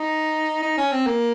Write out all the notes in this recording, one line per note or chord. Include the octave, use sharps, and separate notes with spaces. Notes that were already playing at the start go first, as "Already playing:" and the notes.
Already playing: D#4
D#4
C#4
C4
A#3